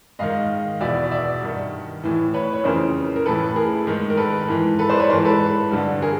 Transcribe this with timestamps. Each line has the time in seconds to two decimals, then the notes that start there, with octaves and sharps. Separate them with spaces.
0.19 G#2 D#3 D#5 F5
0.81 E2 B2 D5 E5
1.11 D5 E5
1.42 G2 D#3
2.04 A2 E3
2.34 B4 C#5
2.53 C#5
2.64 F2 C#3 E3 A#4 C5
3.16 A#4
3.26 A2 E3 A4 B4
3.56 G#4 A#4
3.87 G#2 D#3
4.10 A#4
4.17 A4 B4
4.48 G#2 E3
4.79 A4 B4
4.89 C5 D5
5.00 B4 C#5
5.10 E3 A#4 C5
5.13 G#2
5.25 A4 B4
5.71 G2 D3
6.02 G#4 A#4